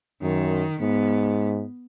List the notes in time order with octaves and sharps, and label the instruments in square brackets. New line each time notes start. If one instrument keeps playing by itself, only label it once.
[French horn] F#2 [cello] D#3
[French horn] G#2 [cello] B3